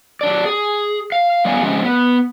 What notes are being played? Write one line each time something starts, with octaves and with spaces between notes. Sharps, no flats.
F#3 D4 D5
G#4
F5
G3 B3 C#5 F5 G#5
F3 G#3 C4 C#4
B3